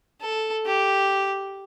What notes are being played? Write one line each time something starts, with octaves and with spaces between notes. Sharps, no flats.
A4
G4